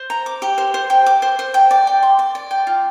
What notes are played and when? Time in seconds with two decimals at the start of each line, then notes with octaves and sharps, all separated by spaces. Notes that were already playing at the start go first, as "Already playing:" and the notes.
Already playing: C5
0.10 A#5
0.26 D6
0.42 G4
0.58 C5
0.74 C5
0.90 G5
1.06 D6
1.22 C5
1.39 C5
1.54 G5
1.71 D5
1.87 G5
2.03 C6
2.19 D5
2.35 D5
2.51 G5
2.67 F4